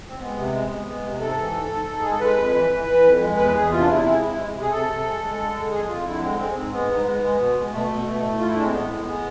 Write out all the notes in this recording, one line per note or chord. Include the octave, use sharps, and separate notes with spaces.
C4
G#3 B3
C3
G#3
G#3
G#3
C3
G#2 A4
E3
G#2
G#2
G#2
G#3 G#4
A4
G#3 B4
F2
E3
E3
E3
F2
G#3
E2 B4
E2 G#4
C3 F4
D4
C3 E4
G#3 E4
C3 E4
G#3
C3
G#4
C3 A4
C3
G#3
G#3
D3
G#3
F2 G#4
F2 F4
D3 E4
G#3 C4
G#3 C4
G#2 C4
G#3 B3
G#2
G#3
G#3
B2
G#3
B2 A3
B2
B2
A2
A2 F4
E4
G#3 D4
C4
A2 B3
G#3
G#3